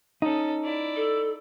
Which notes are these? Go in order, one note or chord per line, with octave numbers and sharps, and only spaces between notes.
C#4 D#4 A4
E4 D5
A4